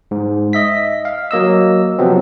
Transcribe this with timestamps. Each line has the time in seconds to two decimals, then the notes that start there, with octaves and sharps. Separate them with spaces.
0.11 G#2
0.53 D#5 E5 B6
1.05 F5
1.31 F#3 A#3 D#5 E6
1.99 C3 F3 F#3 B3 C4